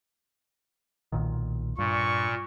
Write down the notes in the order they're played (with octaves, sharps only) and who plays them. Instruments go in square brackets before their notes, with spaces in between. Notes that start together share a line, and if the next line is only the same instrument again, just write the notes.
[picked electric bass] B1 A#2 D#3
[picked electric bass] G2 [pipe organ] A#2 [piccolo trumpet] C#6